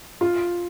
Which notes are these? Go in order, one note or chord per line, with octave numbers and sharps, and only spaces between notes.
F4